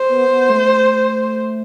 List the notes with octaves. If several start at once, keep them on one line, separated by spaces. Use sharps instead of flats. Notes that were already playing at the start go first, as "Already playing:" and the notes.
Already playing: C5
B3
B3
A3